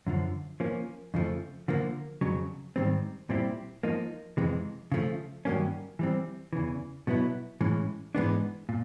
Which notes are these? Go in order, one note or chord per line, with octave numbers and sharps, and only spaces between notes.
F#2 D3 F3
F3 A#3 C#4
F2 C#3 F3 A3
D3 F3 A#3
F2 C#3 F#3
G#2 D#3 G3 C4
A#2 G3 C4 E4 G4
F3 A#3 D#4
F2 C3 E3 G#3
C#3 F3 A3
G2 D#3 F#3 A#3 C#4
E3 G3 C4
E2 C#3 E3
B2 F#3 B3 E4
A2 E3 G#3 C#4
G#2 E3 G#3 B3 D4
A#2